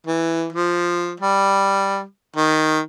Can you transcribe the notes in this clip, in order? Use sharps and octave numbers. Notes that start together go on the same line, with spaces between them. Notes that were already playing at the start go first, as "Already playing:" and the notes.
E3
F3
G3
D#3